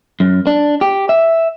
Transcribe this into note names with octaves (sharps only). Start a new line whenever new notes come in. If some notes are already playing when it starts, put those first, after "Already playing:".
F#2
D4
G4
E5